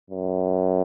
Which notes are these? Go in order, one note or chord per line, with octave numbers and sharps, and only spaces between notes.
F#2